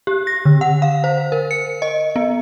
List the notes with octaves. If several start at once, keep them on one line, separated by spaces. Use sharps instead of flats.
G4
A#6
D3
F#5
F5
C5
A#4
C#7
D#5
B3